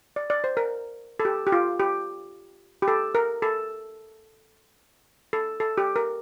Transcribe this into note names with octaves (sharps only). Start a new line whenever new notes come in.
D5
D5
C5
A#4
A4
G4
G4
F4
G4
G4
A4
A#4
A4
A4
A4
G4
A#4